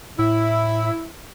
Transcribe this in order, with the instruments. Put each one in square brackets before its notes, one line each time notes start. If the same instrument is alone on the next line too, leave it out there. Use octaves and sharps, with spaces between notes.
[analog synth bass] A2 [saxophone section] E4